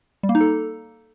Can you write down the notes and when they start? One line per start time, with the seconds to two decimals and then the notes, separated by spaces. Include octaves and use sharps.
0.23 G3
0.29 A#3
0.35 D#4
0.41 A4